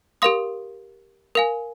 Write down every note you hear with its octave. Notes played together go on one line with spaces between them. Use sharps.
G4 A#4 F5 C6 D#6
A#4 F5 G#5